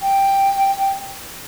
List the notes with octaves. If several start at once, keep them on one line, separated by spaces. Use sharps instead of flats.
G5